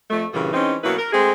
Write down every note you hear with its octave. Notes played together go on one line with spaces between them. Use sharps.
F2 A3
G2 A#2 C#3 E3 G3
E3 G#3 C4 C#4 D#4
B2 F#3 A#3 E4 B4
A#4
G#3 A3 C4 G#4